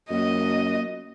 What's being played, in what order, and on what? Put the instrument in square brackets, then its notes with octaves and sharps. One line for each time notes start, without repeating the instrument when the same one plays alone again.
[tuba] F#2 [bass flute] A#3 [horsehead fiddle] D#5